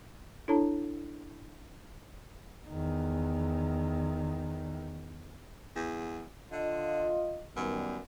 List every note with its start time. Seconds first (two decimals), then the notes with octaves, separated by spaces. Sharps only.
0.48 D4 E4 A4 C#5 A5 A#5
2.68 E2 D#3
5.76 E2
6.51 D3 F4 D#5
7.57 F#2 D#3 G3 B3